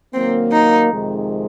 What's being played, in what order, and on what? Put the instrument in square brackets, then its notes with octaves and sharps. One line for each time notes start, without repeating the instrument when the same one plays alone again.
[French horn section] D#3 F#3 A#3 [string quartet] C4
[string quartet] D#4
[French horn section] F2 C3 D#3 G#3